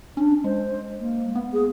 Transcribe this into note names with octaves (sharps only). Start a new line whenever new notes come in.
C#4 D4
G#3 C5
A#3
B3
G#4